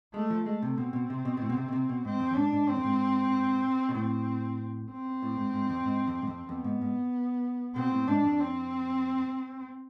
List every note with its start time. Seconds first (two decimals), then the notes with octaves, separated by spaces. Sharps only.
0.14 G#3 A3
0.30 F3
0.46 G#3 A3
0.62 C3
0.78 B2 C4
0.93 B2
1.10 C3
1.25 B2
1.37 B2
1.42 A2
1.49 B2
1.57 C3
1.68 B2
1.73 C3
1.89 B2
2.05 G#2 C4
2.20 F2
2.31 F2
2.36 G#2 D4
2.52 G#2
2.68 G#2 C4
2.76 F2
2.85 G#2
3.89 B2
3.95 A2 C4
4.91 C4
5.22 A2
5.37 G#2
5.54 G#2
5.70 F2
5.85 G#2
6.07 F2
6.22 G#2
6.27 F2
6.49 F2 B3
6.64 G#2
6.81 G#2
7.76 B2 C4
7.92 A2
8.07 G#2 D4
8.24 F2
8.40 C4